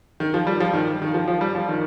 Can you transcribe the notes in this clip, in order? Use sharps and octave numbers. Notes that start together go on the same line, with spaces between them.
D#3
F3
G3
F3
D#3
D#3
F3
F3
G3
F3
D#3